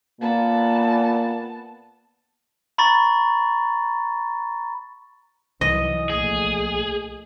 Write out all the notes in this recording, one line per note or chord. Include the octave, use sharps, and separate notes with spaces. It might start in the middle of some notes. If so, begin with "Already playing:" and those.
A#2 A#3 B3 A5
A#5 B5 C#6 A6
C2 E3 F#3 D#5
A#1 A3 G#4